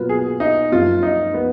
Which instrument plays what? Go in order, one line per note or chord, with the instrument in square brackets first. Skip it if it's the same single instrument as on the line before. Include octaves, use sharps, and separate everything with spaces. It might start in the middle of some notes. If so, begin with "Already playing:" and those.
Already playing: [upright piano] B2 F#3 A#3 F4 B4
[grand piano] G#4
D#4
[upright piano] F#2 F3 A#3 [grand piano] F4
[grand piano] D#4
B3